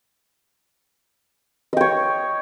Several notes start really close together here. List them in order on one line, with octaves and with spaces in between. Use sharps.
D#5 G5 C#5